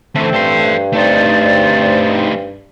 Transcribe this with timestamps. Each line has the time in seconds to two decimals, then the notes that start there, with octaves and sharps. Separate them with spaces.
0.15 D3 E3 A3 C4 C5
0.33 G2 A4 C6
0.92 G3 A3 C4 D#4 C5 D5